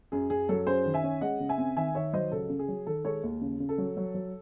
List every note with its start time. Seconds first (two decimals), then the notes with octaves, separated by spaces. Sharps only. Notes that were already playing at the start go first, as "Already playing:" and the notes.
0.12 F#2 G#4
0.30 F#2 G#4
0.49 F#3 A4
0.66 F#2 G#4 C5
0.86 D#3
0.94 E5 G#5
1.04 C#4
1.21 G#3 D#5 F#5
1.40 C#3
1.49 E5 G#5
1.58 C4
1.76 D#3 E5 G#5
1.95 D#3 C#5 E5
2.13 F#3 C5 D#5
2.32 C#2 A4
2.50 C#3
2.59 G#4
2.68 F#3
2.87 D#3 A4
3.04 G#3 A4 C#5
3.23 D#2
3.41 C#3
3.60 C#3
3.69 A4
3.78 F#3
3.97 F#3
4.15 F#3